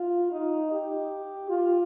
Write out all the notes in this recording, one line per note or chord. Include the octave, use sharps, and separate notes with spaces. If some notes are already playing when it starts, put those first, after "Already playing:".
Already playing: F4
D#4
G4
F4